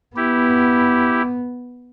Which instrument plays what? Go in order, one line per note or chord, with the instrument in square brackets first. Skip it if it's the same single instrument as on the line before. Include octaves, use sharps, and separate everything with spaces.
[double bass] B3 [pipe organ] E4 G4